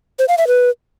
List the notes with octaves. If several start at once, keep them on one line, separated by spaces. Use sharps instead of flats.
C5
F5
E5
B4